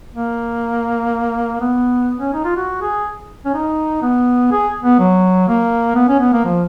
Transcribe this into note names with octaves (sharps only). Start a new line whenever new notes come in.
A#3
B3
C#4
D#4
F4
F#4
G#4
C#4
D#4
B3
G#4
B3
F#3
A#3
B3
C#4
B3
A#3
F3